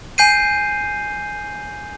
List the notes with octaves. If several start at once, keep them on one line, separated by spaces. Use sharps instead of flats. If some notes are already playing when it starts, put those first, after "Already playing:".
G#5 G6 C7 D#7